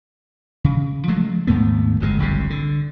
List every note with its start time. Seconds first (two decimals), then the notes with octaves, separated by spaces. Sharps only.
0.64 C#3
1.08 F3 F#3 G#3 A3
1.47 D#2 G#2 A3 B3
2.00 G1 F2 C3 G#3
2.19 G1 C2 F#2 C#3
2.50 D3